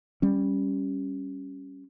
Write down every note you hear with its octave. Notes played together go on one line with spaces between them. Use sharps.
G3 C#4